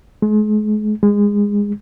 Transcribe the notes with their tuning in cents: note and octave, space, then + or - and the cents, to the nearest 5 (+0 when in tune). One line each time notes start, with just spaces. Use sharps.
G#3 +40
G#3 -20